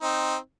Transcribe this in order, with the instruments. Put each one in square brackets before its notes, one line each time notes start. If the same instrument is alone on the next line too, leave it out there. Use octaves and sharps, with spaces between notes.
[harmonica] C4 D#4